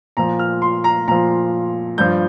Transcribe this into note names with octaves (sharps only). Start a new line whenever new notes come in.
A#2 F3 A#5
F6
C6
A#5
A#2 F3 A#5
G2 F3 G6